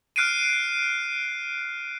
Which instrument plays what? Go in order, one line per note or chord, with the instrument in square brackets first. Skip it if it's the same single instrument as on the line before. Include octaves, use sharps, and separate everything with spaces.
[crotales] F6 F#6 C7 D7 D#7